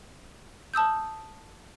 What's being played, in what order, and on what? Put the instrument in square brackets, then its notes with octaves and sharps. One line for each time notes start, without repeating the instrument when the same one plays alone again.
[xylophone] A5 D#6 E6 G6